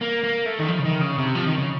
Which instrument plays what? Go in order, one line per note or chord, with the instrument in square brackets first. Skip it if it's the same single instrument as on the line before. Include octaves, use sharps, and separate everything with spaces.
[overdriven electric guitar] A#3
A#3
A3
D#3
F3
C#3
D#3
C#3
C3
F3
D#3
C#3